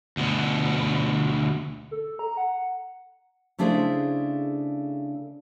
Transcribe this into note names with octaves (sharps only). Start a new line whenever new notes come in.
D2 B2
A4
A#5
F#5
C#3 A3 D4 E4 G#4 C5